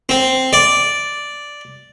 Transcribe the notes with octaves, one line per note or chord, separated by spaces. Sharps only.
C4
D5